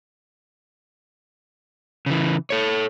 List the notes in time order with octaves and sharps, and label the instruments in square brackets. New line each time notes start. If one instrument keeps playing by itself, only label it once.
[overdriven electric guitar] C#3 E3
A4 C#5